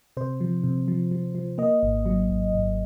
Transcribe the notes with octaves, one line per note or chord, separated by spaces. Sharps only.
C3 C5
F3
C3
F3
F3
F3
A#3 D#5
G#1
F#3
G#1
G#1